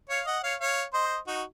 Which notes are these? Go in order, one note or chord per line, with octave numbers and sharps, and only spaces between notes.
C#5 F5
D#5 F#5
C#5 F5
C#5 F5
C5 D#5
D#4 F#4